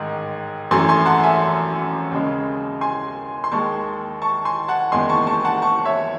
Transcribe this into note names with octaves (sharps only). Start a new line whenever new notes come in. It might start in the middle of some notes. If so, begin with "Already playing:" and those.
Already playing: A1 G#2 D#3 G#3
G#1 F#2 E3 A3 G#5 C6
G#5 C6
F#5 A5
E5 G#5
D#2 C#3 G#3
G#5 C6
C6
D#2 D#3 G#3 A5 C#6
A5 C#6
G#5 C6
F#5 A5
F#1 E2 D#3 G#3 G#5 C6
A5 C#6
A5 C#6
F#5 A5
A5 C#6
C#5 E5